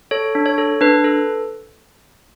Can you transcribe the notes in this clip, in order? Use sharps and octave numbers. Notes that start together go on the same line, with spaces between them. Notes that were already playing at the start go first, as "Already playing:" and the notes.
A4 C#5
D4
C#5
A4
D4 B4
A4